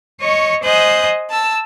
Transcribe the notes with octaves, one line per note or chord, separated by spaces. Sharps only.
C#5 D#5 C#6
C5 D#5 G#5 D#6 F#6 G6
A5 E6